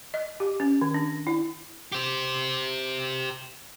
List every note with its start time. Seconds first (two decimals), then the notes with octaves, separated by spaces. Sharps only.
0.14 D#5
0.40 G4
0.60 C#4
0.81 D#3
0.94 D4
1.27 E4
1.92 G4 C5